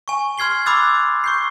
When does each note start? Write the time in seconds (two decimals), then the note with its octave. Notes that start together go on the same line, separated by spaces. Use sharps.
0.08 G#5 C#6
0.38 C6 F6 G#6 C7 G7
0.66 B5 C6 D6 E6 F#6 A6
1.24 C#6 G6 C7